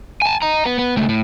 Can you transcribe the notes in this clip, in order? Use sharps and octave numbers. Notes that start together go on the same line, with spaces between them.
G#5 A5
D#5 A#5
B3
B3
C#2 A3
A2